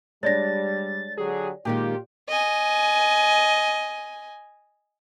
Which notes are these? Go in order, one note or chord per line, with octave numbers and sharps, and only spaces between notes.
G3 G#3 D4 C#5 D5 A6 A#6
D3 F#3 G4 G#4
A#2 D#3 G#3 F4 G4
D#5 G#5